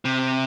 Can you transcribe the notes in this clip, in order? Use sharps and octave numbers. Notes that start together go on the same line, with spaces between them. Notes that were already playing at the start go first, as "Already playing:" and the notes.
C3